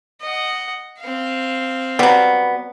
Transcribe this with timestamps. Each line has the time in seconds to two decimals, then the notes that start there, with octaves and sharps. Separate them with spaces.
0.21 D#5 F#5
1.00 C4 F5
1.99 F#3 G3 B3